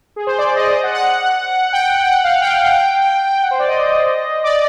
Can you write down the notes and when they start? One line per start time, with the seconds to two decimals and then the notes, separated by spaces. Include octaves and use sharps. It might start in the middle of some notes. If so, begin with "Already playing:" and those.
0.16 G#4
0.27 C5
0.38 D5
0.56 D#5
0.72 D#5
0.83 F#5
0.95 F#5
1.73 G5
2.07 F#5
2.24 F5
2.41 G5
3.43 F#5
3.51 C5
3.59 D5
3.68 D#5
4.44 D5